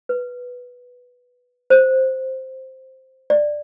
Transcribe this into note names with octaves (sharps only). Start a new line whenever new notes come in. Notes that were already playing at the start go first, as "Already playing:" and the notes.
B4
C5
D5